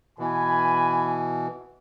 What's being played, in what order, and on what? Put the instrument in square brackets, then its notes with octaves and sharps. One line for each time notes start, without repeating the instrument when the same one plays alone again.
[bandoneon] B2 E3 [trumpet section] G#5 B5